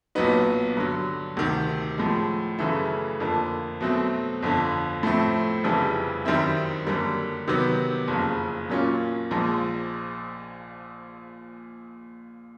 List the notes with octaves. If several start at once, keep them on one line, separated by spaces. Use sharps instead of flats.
B1 A#2 F#3 B3 D#4
G2 D3 F#3
D2 C3 D#3
A2 F3 G#3
F#2 C#3 E3 A3
F2 D3 F3 A#3
B2 F#3 A3 C4
G1 F2 D3
A2 F3 A3 C4
F1 F2 C#3 E3 G3
F#2 D#3 G3 C4 E4
F#2 D3 G3 A#3
C3 D#3 F#3 B3
F#1 F2 C#3
A#2 F#3 A#3 C#4 F4
A#1 A#2 F3 G#3